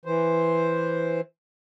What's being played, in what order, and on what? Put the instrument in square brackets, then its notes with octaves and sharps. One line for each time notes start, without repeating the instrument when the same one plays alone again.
[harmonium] E3 C5